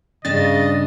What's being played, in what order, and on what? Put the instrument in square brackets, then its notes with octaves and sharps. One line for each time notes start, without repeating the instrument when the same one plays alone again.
[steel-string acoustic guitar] G2 C#4 D4 [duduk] C#3 [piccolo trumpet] D#5 [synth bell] A6